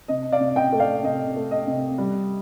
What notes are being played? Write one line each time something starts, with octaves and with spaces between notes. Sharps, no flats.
C3 D#5
D5 F5
C3
D#5 G5
A3
D5 F5
C3 D#5
A3
D#5
C3
G3